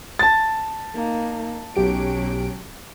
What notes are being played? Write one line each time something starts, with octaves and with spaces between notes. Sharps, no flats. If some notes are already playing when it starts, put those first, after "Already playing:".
A5 A6
A#3 D#4
B1 F#3 C#4 G4 D7